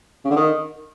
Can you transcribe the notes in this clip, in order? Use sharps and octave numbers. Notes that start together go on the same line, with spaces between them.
C#3
D3
D#3